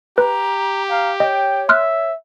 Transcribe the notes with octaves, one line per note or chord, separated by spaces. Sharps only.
G4 B4 A#5
F5 A#5
C#5 D#5 G5
E5 C6 F6 F#6